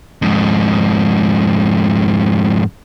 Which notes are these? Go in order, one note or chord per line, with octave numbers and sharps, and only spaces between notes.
F2 G#2